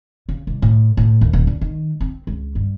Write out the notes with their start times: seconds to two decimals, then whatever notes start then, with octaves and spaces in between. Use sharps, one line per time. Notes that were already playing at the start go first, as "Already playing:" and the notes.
0.29 C#3
0.47 C2
0.62 A2
0.97 A2
1.21 D#2
1.33 D#1
1.47 D3
1.61 D#3
2.01 C4
2.27 C#2
2.55 G2